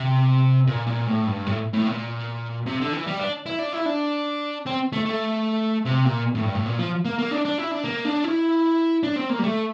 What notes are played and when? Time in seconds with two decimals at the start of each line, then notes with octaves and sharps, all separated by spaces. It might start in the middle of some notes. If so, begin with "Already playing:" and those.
Already playing: C3
0.67 A#2
0.87 A#2
1.07 A2
1.27 G2
1.46 A2
1.73 A2
1.86 A#2
2.66 C3
2.80 D3
2.93 E3
3.07 G3
3.20 D4
3.46 E4
3.59 D4
3.73 E4
3.86 D4
4.66 C4
4.92 A3
5.05 A3
5.85 C3
6.05 A#2
6.35 A2
6.45 G2
6.55 A2
6.65 A#2
6.78 F3
7.05 A#3
7.18 A#3
7.31 D4
7.45 D4
7.58 E4
7.71 D4
7.84 A#3
8.05 D4
8.24 E4
9.04 D4
9.17 C4
9.30 A#3
9.39 G3
9.44 A3